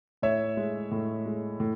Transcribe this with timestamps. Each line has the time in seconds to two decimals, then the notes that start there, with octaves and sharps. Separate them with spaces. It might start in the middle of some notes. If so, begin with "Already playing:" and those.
0.22 A2 C#5 E5
0.57 G#3
0.91 A2
1.26 G#3
1.60 A2